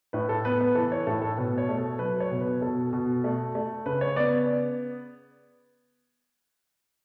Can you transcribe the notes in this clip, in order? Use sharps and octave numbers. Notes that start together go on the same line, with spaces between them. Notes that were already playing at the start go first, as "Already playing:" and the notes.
A2 B4
A4
B3 B4
B4
E3 A4
C#5
A2 A4
A4
B2 B4
C#5
A3
A4
F#3 B4
C#5
B2
B4
B2 A4
B2
A3
A3
C#3 B4
C#5
B3 D5